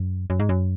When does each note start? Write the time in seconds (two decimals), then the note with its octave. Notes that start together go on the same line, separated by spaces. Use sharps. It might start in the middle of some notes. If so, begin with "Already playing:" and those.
Already playing: F#2
0.30 F#2
0.40 G#2
0.49 F#2